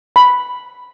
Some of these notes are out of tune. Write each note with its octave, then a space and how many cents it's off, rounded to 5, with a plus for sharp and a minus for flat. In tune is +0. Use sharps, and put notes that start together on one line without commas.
B5 +0